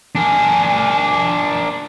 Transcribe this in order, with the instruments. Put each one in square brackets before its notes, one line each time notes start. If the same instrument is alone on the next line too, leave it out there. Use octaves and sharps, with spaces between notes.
[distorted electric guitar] D4 A#4 [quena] G#5